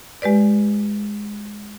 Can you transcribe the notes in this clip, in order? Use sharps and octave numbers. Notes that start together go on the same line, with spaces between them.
G#3 G4 B4 D5